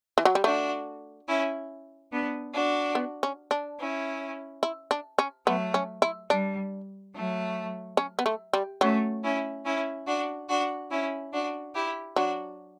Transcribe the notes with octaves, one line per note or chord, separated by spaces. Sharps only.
E3
F#3
G3
A3 D4 F#4
C#4 E4
B3 D4
D4 F#4
B3
C#4
D4
C#4 E4
E4
D4
C#4
F#3 A3 B3
C#4
E4
G3 D4
F#3 A3
C#4
B3
A3
G3
F#3 A3 C#4
C#4 E4
C#4 E4
D4 F#4
D4 F#4
C#4 E4
D4 F#4
E4 G4
F#3 D4 F#4